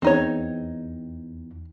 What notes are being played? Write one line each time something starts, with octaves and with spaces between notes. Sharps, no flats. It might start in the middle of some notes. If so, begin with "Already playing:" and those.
E2 C4 D#4 C#5